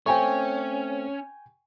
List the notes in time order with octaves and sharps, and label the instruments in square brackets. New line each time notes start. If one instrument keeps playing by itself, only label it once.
[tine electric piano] A3 C4 [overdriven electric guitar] C#4 [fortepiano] G5 G#5 C#6